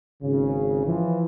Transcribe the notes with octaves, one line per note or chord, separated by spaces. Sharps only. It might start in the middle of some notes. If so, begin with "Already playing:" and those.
G#1 C#3
E3 F3